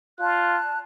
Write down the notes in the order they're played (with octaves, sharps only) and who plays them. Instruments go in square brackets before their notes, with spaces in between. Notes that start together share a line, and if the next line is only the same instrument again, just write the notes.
[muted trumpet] F4 [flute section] D5 A5 F#6